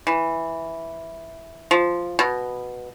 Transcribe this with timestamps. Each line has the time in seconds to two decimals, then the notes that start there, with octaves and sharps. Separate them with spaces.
0.07 E3
1.71 F3
2.19 B2